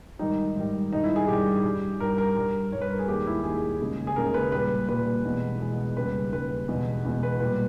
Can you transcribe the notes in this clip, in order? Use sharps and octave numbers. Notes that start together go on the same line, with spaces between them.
G#2 D#3 G3 D#4
G#2 D#3 G3
G2 D#3 G3 D#4
E4
G#4
G2 D#3 G3 G4
G2 G3
G2 G3 A#4
A#4
G2 G3 A#4
G2 G3 C#5
B4
A#4
G#4
D#2 D#3 G#3 G4
E4
D#2 D#3 G#3 G#4
D#2 C#3 G#3
G#4
D#2 C#3 G#3 A#4
B4
A#2 G3 B4
A#2 G3 B4
E2 B2 G#3
E2 B2 G#3
D#2 C#3 G3 B4
D#2 C#3 G3 B4
E2 B2 G#3
E2 B2 G#3
B4
A#2 G3 B4